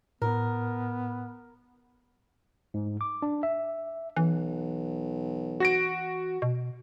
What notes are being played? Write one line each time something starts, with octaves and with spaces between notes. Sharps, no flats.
A2 B3 A#4
G#2
D6
D4
E5
B1 E3
F#4 A#6 D7
B2